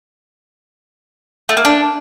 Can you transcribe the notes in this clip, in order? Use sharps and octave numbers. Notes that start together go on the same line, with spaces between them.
A3
A#3
D4